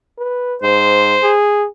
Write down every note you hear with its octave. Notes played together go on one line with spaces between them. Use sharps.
B4
G#2 C5
G#4